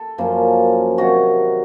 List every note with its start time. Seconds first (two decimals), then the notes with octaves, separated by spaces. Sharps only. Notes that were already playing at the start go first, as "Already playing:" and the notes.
Already playing: A4
0.18 F#2 F3 A#3 C#4
0.98 C3 D#3 F#3 F#4